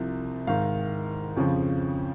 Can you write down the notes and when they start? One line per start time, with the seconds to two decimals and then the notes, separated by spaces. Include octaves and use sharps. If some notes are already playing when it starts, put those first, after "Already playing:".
Already playing: C2 C3 F3
0.47 G#2 D#3 F5
1.36 F2 C#3 F3